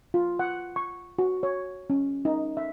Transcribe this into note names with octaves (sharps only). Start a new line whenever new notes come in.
F4
F#5
C#6
F#4
C#5
C#4
D#4
E5